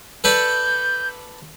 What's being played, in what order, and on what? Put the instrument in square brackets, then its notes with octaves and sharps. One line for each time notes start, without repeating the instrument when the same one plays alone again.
[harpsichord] A4 B4 D5 [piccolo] G6